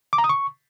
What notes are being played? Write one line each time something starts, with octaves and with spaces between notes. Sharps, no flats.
D6
A#5
D#6
C#6